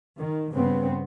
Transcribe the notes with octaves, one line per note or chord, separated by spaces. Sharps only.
D#3
G2 C#3 B3 C4